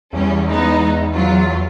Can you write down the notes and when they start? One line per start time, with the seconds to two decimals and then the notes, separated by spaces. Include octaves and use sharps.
0.13 E2 G3 C#4
0.48 G#3 B3 D#4
1.14 F#3 F4